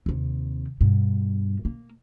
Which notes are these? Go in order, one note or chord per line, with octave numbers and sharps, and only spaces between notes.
D#2 C3
G2 B2
A#3